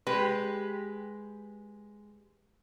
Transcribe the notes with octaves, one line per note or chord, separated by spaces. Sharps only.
G#3 G4 B4